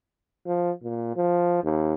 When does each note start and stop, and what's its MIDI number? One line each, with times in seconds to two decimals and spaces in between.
0.47 0.71 53
0.83 1.15 46
1.17 1.60 53
1.64 1.94 39